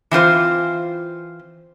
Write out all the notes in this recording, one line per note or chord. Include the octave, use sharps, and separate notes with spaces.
E3 C4 F4 C5